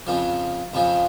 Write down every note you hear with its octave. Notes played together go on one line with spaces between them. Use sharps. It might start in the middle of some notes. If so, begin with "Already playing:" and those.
F2 C#3 F3
F2 C#3 F3